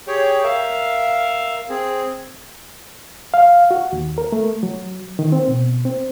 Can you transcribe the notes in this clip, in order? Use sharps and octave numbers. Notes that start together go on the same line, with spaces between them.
G4 G#4 C#5 G5
A#4 E5 F5
C4 G#4
F5
F#4
D#2
A#4
A3
F#3
D#3
C4
B2
C4